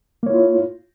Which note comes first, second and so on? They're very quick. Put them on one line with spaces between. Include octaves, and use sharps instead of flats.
A#3 C#5 E4 F4